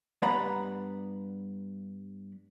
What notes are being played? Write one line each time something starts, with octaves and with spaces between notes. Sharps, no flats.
G2 B3 D5 F#5 A#5 B5